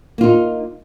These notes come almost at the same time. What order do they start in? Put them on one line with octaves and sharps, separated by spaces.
A#3 F4 D#4